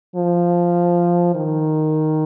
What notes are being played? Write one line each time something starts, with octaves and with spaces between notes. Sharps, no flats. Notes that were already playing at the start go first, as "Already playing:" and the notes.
F3
D#3